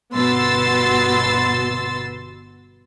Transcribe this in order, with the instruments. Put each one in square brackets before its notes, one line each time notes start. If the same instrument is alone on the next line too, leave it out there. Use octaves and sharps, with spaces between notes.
[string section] G1 B2 B3 C6 E6 A6